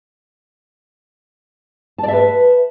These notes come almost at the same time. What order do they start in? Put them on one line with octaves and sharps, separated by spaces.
A5 D5 E5 B4